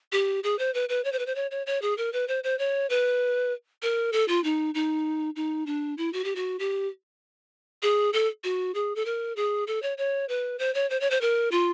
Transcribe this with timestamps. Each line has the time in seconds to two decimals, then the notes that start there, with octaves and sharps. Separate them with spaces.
0.12 G4
0.44 G#4
0.59 C5
0.74 B4
0.89 B4
1.05 C#5
1.12 C5
1.19 B4
1.26 C5
1.35 C#5
1.51 C#5
1.67 C#5
1.82 G#4
1.98 A#4
2.13 B4
2.28 C5
2.44 C5
2.59 C#5
2.90 B4
3.82 A#4
4.13 A4
4.28 F4
4.44 D#4
4.75 D#4
5.36 D#4
5.67 D4
5.98 E4
6.13 F#4
6.24 G4
6.36 F#4
6.59 G4
7.82 G#4
8.13 A4
8.44 F#4
8.75 G#4
8.96 A4
9.05 A#4
9.36 G#4
9.67 A4
9.82 C#5
9.98 C#5
10.29 B4
10.59 C5
10.74 C#5
10.90 C5
11.01 C#5
11.11 C5
11.21 A#4
11.52 F4